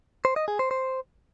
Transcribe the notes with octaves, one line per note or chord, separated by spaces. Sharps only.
C5
D#5
G#4
C5
C5